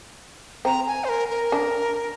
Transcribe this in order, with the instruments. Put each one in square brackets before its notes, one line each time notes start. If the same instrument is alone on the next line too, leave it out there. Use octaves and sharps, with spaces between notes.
[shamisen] C4 [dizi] A#5
[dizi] G#5
C5
A#4
A#4
[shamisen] D4